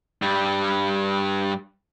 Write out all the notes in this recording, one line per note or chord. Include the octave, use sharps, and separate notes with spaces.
G2 G3